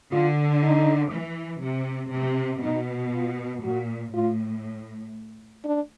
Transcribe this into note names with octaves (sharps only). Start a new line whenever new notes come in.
D3 F4
D#4
E3
C3
C3
B2 D#4
F4
A#2 F#4
A2 F4
D4